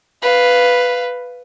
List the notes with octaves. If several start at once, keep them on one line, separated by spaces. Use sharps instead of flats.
B4 F5